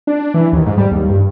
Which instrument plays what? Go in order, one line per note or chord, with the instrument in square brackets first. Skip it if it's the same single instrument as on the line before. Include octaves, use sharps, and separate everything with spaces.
[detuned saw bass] D4
E3
D#2
G#2
G3
D#2
G2